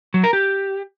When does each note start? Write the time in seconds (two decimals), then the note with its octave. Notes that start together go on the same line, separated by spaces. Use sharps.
0.14 F#3
0.24 A#4
0.33 G4